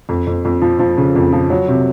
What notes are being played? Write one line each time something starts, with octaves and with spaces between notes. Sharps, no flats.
F2
F2
F2
F3
F3
C#3
F2
F3
F#3
C3